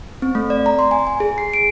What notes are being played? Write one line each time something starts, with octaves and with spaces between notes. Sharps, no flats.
C4
A3
D5
A#5
C6
G#5
G#5
G#4
C7
D7